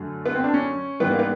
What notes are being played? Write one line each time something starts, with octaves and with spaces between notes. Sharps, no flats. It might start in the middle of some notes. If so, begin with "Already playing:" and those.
Already playing: F#2 D3 F#3 A3
B3
C4
D4
C#4
G#2 E3 G3 B3
A#3
B3